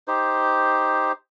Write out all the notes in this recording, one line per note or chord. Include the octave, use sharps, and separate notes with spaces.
D#4 G4 C5